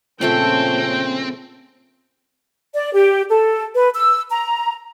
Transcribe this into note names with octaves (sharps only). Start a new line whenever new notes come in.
A#2 C#3 F3 A3 C4 C#4 A4 G5
D5
G4
A4
B4
E6
A#5